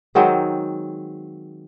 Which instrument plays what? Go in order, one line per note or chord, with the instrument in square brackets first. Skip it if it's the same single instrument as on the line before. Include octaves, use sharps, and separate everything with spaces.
[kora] D#3 F#3 G#3 C4